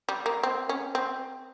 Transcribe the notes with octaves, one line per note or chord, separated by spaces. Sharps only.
G3
A#3
C4
C#4
C4